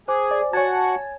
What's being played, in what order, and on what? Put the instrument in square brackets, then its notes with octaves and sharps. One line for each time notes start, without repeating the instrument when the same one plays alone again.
[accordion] G#4 [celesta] C5 G#5 D6
[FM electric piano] D5
[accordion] F#4 F#5 [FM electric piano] C#5 A5 [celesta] G#5 G#6